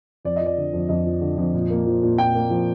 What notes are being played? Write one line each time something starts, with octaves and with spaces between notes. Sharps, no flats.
F2 D5
F3 D#5
D5
D3
F2
F2 D#5
F3
D3
F2
A#2
A#3
F3
A#2
A#2 G5
A#3
F3